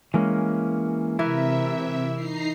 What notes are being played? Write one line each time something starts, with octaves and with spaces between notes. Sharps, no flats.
E3 G#3 A#3 C#4
C3 E3 E4 A#4 E5
D#4 A#5 C7